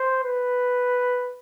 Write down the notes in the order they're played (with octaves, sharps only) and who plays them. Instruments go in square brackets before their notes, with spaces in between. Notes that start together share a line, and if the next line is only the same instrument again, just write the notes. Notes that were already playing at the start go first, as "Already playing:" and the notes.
Already playing: [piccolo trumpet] C5
B4